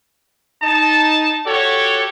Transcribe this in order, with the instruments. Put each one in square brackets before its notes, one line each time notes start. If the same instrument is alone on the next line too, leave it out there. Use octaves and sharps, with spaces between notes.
[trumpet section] D#4 A5
F#4 G4 A4 C#5